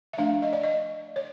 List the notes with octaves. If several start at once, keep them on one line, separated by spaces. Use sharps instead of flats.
E5
F3 A3 D4 F5
D#5
D5
D#5
C#5